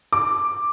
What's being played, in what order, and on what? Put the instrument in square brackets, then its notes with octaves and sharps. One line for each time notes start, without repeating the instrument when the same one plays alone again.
[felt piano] D6